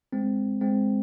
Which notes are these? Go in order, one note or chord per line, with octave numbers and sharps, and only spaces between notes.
G#3 C4
G#3 C4